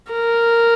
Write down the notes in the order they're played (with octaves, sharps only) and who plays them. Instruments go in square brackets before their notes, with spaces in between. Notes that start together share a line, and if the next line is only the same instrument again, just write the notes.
[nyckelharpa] A#4